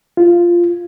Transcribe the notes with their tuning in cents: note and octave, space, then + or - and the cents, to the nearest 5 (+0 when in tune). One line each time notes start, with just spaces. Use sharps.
F4 -10